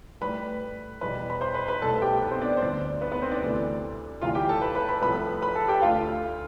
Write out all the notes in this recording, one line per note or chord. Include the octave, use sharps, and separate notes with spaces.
A2 G3 B4 B5
E2 B2 G3 B4 B5
B5
C5 C6
B4 B5
B4 B5
C2 B2 A3 A4 A5
G4 G5
B3 B4
C4 C5
D4 D5
C5
D2 D3 G3 D4 D5
B3 B4
B3 B4
C4 C5
D4 D5
D2 C3 E3 A3
D2 C3 E3 G3 F4 F5
G4 G5
A4 A5
B4 B5
B4 B5
B4 B5
C2 C3 F3 A3 B4 B5
B4 B5
A4 A5
G4 G5
D2 D3 A3 F4 F5